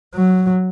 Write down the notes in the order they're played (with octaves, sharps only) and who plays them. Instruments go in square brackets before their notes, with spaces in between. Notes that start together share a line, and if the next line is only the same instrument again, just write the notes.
[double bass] F#3